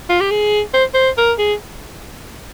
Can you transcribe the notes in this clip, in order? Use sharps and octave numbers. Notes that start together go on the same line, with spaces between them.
F4
G4
G#4
C5
C5
A#4
G#4